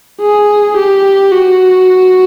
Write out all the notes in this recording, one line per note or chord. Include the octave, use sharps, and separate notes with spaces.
G#4
G4
F#4